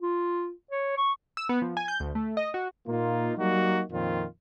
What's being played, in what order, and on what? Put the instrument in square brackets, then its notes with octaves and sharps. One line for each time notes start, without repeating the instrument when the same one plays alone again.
[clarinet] F4
C#5
C#6
[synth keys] E6
B3
F3
G#5
G6
D2
A3
D#5
F#4
[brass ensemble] A#2 A#3 D#4 F4
F#3 G3 A#3 D#4 F#4
F2 A#2 D#3 C4 F4